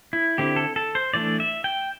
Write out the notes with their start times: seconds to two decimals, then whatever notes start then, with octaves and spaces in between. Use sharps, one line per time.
0.13 E4
0.38 D3 C4 E4 G4
0.56 A4
0.76 A4
0.95 C5
1.14 E3 A3 D4 D5
1.40 E5
1.64 G5